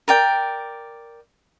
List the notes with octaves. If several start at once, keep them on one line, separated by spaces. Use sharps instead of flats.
A#4 D5 G5